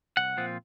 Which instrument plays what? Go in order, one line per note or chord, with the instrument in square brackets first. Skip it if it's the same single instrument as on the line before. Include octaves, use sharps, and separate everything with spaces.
[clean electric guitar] C2 F#5
A#2 F3 C4 F4